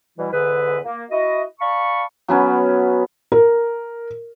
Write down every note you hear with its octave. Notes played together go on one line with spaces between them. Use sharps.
B2 E3 G3 E4
E2 G#2 D3 G#4 B4
A#3
E4 F#4 D#5
D5 F5 A5 B5 C#6
F#3 B3 C#4 B4
A#4